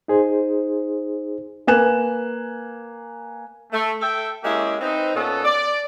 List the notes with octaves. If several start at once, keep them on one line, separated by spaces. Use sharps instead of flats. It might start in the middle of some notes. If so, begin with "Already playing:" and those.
D#4 G#4 C5
A#3 B4 G#5 F#6 E7
A3
A4 E5 G5
G#3 A#3 C#4 E4 G4 G#4
C4 D#4 B4
A#2 B3 C#4 A4
D5